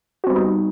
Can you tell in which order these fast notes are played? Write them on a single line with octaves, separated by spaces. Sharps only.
F#4 C4 G3 B3 D#4